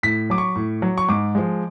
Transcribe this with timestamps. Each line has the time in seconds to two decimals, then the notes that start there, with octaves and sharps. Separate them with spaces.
0.03 A2 B6
0.30 F#3 D6
0.38 C#6
0.56 A2
0.82 F#3
0.98 C#6
1.09 G#2 D6
1.35 F3 G#3